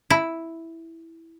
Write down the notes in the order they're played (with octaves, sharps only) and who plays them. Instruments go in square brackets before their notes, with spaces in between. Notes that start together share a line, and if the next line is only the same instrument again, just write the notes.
[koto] E4